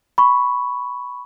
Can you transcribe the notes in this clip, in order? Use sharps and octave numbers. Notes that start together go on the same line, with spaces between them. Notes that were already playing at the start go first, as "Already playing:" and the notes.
B5 C#6